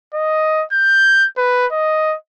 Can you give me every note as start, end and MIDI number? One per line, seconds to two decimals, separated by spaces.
0.14 0.64 75
0.73 1.27 91
1.38 1.67 71
1.72 2.16 75